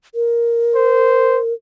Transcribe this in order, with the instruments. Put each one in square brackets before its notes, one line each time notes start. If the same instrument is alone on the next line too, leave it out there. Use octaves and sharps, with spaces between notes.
[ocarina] A#4
[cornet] C5